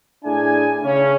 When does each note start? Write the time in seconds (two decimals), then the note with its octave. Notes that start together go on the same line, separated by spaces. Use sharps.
0.25 A2 D4 E4 G#4 G#5
0.83 C#3 C#4